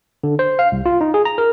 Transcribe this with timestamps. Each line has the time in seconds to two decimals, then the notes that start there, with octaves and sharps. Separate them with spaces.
0.24 D3
0.39 C5
0.59 F5
0.72 C2
0.86 F4
1.01 D#4
1.14 G#4
1.25 A#5
1.38 A#4